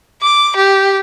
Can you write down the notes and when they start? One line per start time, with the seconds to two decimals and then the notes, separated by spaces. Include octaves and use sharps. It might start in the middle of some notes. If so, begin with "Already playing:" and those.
0.22 D6
0.56 G4